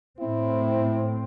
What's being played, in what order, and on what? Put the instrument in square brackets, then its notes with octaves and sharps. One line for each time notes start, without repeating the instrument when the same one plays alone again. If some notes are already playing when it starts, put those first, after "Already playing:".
[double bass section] A2 C4 [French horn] E4